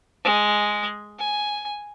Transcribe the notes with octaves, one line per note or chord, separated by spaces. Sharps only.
G#3
G#5